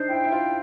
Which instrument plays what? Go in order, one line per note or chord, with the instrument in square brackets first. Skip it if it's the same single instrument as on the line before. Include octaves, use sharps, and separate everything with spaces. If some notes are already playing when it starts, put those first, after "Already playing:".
Already playing: [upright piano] D4 D#4 [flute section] C5
[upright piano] E4 [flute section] G5
[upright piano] E4
[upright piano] F4 [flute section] C5